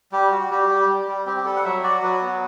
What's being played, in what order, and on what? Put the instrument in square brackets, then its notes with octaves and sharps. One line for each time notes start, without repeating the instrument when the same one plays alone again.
[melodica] G3 G4
F#4
G3 G4
G3
G3
G3
C4 G4
G4
G3 A4
F#5
F#3 E5
F#4 D5
F#3 B4
B3